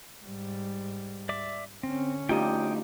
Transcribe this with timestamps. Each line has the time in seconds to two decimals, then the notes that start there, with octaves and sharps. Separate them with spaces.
0.24 G#2 G3
1.29 D5 E5 D6
1.83 D3 C4 C#4
2.29 D2 D#4 F4 G4 G5 D#6